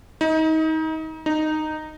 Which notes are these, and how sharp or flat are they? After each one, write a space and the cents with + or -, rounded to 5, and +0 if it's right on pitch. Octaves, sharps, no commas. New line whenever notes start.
D#4 +30
D#4 -10